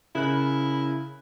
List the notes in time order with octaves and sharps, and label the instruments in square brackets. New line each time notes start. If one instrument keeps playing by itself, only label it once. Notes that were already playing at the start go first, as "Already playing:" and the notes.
[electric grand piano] C#3 A#4 F#6 [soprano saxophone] E4